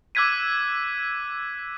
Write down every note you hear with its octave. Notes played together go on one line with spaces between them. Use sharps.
D6 E6 F#6 G#6 B6 D#7